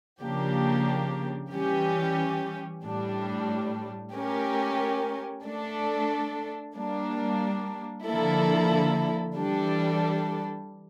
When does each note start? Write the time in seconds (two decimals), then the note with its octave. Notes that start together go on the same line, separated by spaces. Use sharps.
0.22 C#3 F3 A#3 D4 G4
1.53 E3 G3 C#4 G4
2.84 A2 G3 D4
4.14 A3 C#4 G4 A#4
5.45 A3 D4 A4
6.76 G3 A#3 D4
8.07 D3 F3 A#3 E4 A4
9.37 E3 G3 D4 A4